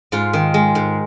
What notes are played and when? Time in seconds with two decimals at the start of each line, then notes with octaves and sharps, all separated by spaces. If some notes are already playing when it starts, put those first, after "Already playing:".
0.12 G#2 F4
0.33 D#3
0.54 G#3
0.75 G#2